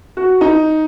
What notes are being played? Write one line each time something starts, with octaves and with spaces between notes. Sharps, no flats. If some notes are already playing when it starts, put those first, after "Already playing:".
F#4
D#4